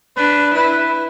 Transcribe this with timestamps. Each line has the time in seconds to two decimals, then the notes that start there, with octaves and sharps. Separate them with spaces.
0.17 D4 B4
0.55 E4 B4